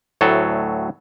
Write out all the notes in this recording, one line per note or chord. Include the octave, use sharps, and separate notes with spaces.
D2 A2 F#3 A4